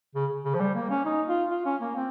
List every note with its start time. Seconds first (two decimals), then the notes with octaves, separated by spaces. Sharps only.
0.15 C#3
0.44 C#3
0.54 F3
0.60 G3
0.75 A#3
0.90 C#4
1.05 D#4
1.28 F4
1.51 F4
1.66 C#4
1.81 A#3
1.96 C4